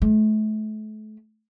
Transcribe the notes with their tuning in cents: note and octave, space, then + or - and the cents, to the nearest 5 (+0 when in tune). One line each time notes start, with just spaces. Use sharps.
A3 -35